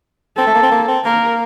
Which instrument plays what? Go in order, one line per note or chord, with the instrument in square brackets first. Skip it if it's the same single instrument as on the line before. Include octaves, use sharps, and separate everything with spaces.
[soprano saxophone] C4 [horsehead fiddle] A4
[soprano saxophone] A3
A#3
C4
A#3
C4
[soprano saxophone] A#3 [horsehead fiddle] A#4